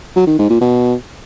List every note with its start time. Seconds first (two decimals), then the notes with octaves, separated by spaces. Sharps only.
0.16 F#3
0.27 D#3
0.39 G#2
0.50 A#2
0.61 B2